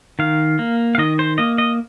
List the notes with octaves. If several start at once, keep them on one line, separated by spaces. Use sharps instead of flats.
D#3 F5
A#3
F5
D#3 D#5
C5
A#3 D#5
D#5